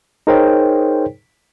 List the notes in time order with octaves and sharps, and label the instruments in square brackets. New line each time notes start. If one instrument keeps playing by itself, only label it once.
[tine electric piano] D#4 G#4 A#4 C5 C#5 G5